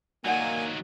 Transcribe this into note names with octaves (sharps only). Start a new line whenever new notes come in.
D#3 F#3 A#3 D#4 D5 F#5 G#5